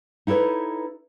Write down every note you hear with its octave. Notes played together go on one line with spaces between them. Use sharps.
D#4 E4 A4 B4 C#5